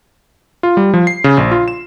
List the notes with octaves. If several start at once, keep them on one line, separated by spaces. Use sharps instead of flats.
F4
G3
F3
C7
C#3
A#1
F4
E7